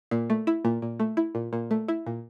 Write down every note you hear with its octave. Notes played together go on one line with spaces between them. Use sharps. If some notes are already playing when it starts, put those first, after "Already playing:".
A#2
A3
E4
A#2
A#2
A3
E4
A#2
A#2
A3
E4
A#2